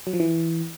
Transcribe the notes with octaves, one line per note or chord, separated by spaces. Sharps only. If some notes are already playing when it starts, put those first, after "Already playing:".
F#3
F3
E3